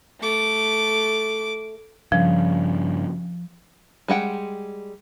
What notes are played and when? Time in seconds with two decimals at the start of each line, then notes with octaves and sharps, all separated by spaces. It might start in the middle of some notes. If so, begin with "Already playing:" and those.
0.20 A3 D6
2.12 G2 C#3 F3
4.08 G3 G#3 F#5 G5